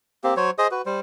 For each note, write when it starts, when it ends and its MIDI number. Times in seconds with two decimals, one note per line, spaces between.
0.24 0.34 58
0.24 0.34 60
0.24 0.34 67
0.37 0.51 54
0.37 0.51 72
0.37 0.51 73
0.58 0.67 68
0.58 0.67 72
0.58 0.67 75
0.58 0.67 87
0.71 0.82 66
0.71 0.82 71
0.86 1.00 55
0.86 1.00 72